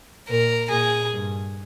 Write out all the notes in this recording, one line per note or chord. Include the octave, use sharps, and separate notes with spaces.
A#2 A#4
A#2 G#4
G2